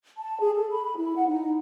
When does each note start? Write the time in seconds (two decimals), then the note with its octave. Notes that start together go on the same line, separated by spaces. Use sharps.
0.19 A5
0.40 G#4
0.56 A4
0.71 B5
0.84 B5
0.96 E4
1.16 F#5
1.28 D#4